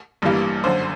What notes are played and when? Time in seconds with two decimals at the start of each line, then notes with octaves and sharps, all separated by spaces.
0.22 A1 G2 E3 G3 A#3
0.64 G#1 F#2 D3 C5